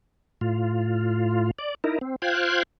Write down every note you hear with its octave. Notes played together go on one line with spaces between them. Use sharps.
A2 F4
D5
D#4 E4 A#4
C4
F4 C5 F5 G5 F#6 G#6